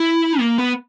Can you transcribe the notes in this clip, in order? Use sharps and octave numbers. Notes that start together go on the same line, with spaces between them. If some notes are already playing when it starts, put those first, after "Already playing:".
Already playing: E4
A#3
B3